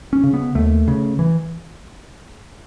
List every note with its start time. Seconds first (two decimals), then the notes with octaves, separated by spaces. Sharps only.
0.13 C#4
0.24 C#3
0.33 B3
0.55 D#2 A3
0.88 C#3
1.19 E3